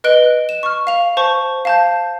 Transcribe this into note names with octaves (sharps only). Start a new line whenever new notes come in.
B4 D#5 F#6 D7 G7
E7
C#6 F6
F5 F7
C5 A5 C#6
F5 A5 G6